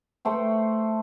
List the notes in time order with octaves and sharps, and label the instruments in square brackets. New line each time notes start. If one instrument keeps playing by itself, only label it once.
[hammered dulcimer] A3 C5 G5